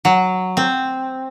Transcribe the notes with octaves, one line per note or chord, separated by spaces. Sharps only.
F#3
C4